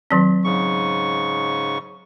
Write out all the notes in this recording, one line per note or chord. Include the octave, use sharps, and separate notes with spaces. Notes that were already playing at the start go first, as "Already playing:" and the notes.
D#3 F#3 C4
G#2 C#3 C#6